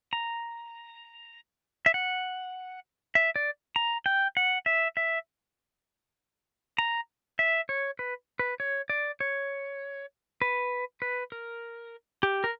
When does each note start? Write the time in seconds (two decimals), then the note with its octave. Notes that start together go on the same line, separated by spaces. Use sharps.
0.13 A#5
1.86 E5
1.94 F#5
3.15 E5
3.36 D5
3.76 A#5
4.06 G5
4.37 F#5
4.66 E5
4.97 E5
6.78 A#5
7.39 E5
7.69 C#5
7.99 B4
8.39 B4
8.60 C#5
8.90 D5
9.20 C#5
10.42 B4
11.02 B4
11.32 A#4
12.23 G4
12.44 A#4